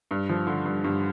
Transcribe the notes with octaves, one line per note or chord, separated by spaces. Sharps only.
G2
F3
D3
G2
G2